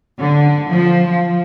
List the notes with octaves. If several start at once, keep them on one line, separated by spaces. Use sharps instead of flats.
D3
F3
F3